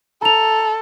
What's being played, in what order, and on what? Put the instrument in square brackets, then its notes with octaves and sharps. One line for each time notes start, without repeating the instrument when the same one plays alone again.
[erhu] A4 [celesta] A#5 F7